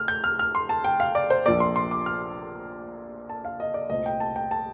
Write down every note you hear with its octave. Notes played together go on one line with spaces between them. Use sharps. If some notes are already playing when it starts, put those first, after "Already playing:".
Already playing: A2 A3 F6
G6
F6
F6
C6
A5
G5
F5
D5
C5
A#1 A#2 F3 A#3 D5
C6
C6
D6
F6
A5
F5
D#5
D5
C2 A#2 A3 C4 D#5
G5
A5
G5
A5